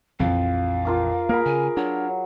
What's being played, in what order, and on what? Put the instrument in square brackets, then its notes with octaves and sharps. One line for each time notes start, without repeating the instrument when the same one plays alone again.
[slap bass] A#1 E3 F3 [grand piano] F2 [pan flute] F5
[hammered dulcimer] F4 A#4 D6
[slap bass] A#3 [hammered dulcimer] G#4 B5 [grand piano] A#4
[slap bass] C#3 [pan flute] G#5
[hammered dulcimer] F#3 [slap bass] D4 [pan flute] C#5